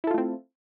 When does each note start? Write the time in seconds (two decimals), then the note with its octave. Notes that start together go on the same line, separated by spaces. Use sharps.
0.04 E4
0.07 A4
0.11 F4
0.14 A3
0.18 C4